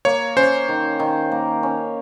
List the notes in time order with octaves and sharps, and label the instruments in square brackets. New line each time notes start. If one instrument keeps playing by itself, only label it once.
[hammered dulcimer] A#3 [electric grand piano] C#5
[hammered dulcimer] C#4 [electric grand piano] C5
[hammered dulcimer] D#3
D#3
A#3
C#4